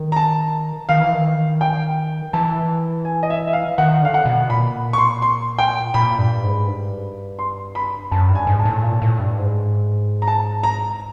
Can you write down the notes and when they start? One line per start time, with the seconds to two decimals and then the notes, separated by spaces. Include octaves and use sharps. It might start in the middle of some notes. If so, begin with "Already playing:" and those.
Already playing: D#3
0.12 A#5
0.16 A5
0.89 D#3 F5
1.01 E3
1.14 D#3
1.61 G5
2.33 E3 A5
3.05 G#5
3.23 D#5
3.30 E5
3.47 E5
3.53 F5
3.78 D#3 F#5
4.02 D3 F5
4.14 F#5
4.26 B2
4.50 A#2 B5
4.93 C#6
4.98 C6
5.22 C6
5.58 G5
5.94 A#2 B5
6.18 G2
6.43 G#2
6.67 G2
7.39 C6
7.75 B5
8.11 F#2 A5
8.29 G2
8.35 G#5
8.47 G#2
8.59 A5
8.65 A2
8.83 A#2
9.02 A2
9.20 G2
9.38 G#2
10.22 A#5
10.28 A5
10.63 A#5